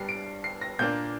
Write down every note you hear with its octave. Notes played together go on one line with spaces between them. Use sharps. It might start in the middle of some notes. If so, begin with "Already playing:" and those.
Already playing: G2 G3 D4 C7
D7
C7
A#6
A#2 A#3 D4 G6